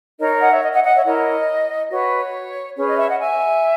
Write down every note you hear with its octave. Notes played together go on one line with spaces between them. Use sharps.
D#4 A#4 C#5 D#5
D#5 F#5
C#5 E5
D#5
D#5 F#5
D#5 F#5
C#5 E5
E4 A#4 C#5 D#5
F#4 B4 C#5
C#4 G#4 B4 C#5
D#5
C#5 E5
D#5 F#5
E5 G#5